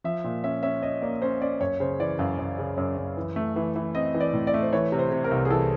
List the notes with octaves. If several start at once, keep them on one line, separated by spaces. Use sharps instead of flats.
F3 E5
A#2
C#4 E5
C#4 E5
C#4 D#5
A#3 D5
C#4 C5
C#4 D5
F#2 C#5
C#3 C5
E3 D5
F#2 F5
F#2
C#3
F#2
F#2
E3
A3
E3
E3
C4 D#5
E3
D5
A2
D5
A3
C5
E3 C#5
C3
C5
C3
A#4
C2
G#4
E3 A4